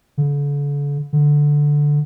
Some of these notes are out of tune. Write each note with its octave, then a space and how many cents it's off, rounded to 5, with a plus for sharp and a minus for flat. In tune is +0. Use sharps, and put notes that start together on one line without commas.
D3 -40
D3 +0